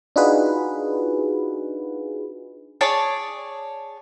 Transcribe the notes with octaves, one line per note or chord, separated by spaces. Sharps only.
D4 D#4 F4 F#4 G#4 B4
G#4 C#5 D5 A5